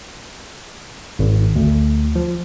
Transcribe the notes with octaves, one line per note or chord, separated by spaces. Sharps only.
G#1
D2
F3